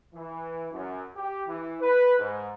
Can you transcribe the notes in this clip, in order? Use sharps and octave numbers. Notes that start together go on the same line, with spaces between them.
E3
F#2
G4
E3
B4
G#2